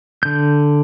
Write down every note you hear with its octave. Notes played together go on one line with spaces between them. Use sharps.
D3 G6